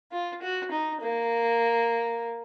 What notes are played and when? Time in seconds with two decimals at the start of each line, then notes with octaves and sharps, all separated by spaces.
0.12 F4
0.42 F#4
0.71 D#4
1.01 A#3